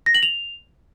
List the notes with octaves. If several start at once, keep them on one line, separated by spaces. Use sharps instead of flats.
A#6
F#7
F7